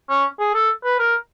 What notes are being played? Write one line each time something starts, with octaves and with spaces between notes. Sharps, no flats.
C#4
G#4
A4
B4
A#4